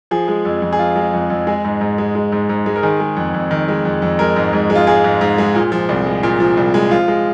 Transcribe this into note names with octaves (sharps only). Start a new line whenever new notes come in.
F3 G#4
G#3
F2
F2
G#4
F3 F4
G#3
F2
F2
G#3 G#4
G#2
G#2
G#3
G#3
G#2
G#2
G#3
A#4
D#3 G#4
G#3
F2
F2
D#3
G#3
F2
F2
G#3 A#4
G#2
G#2
G#3
F4
G#3 G#4
G#2
G#2
G#3
A#2
F3
C2
G#3
A#2
F3
C2
G#3
F3 F4
G#3